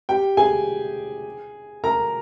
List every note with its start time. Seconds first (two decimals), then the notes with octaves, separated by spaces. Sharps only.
0.09 G4 G5
0.37 G#4 G#5
1.84 A#4 A#5